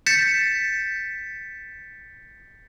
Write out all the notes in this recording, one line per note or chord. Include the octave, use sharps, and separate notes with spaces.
G6 A6 B6 C#7 E7